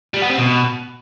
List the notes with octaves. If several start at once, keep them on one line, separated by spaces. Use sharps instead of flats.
G3
B3
C4
B2